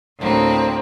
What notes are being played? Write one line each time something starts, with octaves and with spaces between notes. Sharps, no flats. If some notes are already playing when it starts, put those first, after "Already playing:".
D2 A2 A#3 C4